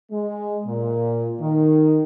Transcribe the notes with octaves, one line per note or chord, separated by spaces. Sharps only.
G#3
A#2
D#3